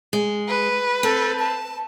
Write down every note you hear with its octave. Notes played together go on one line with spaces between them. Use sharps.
G#3
B4
C4 A4
A5